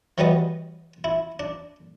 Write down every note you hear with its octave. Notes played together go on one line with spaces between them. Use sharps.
E3 F#3 G3 B3 B4 D#5
E4
D4